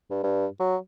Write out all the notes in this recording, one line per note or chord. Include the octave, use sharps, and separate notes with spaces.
G2
G2
F#3